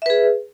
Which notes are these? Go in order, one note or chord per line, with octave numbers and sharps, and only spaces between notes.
G#4 B4 E5